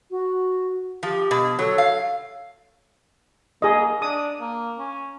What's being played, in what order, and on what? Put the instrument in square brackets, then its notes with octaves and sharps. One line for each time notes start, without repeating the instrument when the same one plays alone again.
[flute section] F#4
[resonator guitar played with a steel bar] F3 [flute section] G4
[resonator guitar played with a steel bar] B2
[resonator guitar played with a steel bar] F#3 [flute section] A4 C#5
[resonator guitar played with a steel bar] F5
[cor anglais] A#3 [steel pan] G#4 D#5
[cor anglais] D4 [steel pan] D#6
[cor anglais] A#3
C#4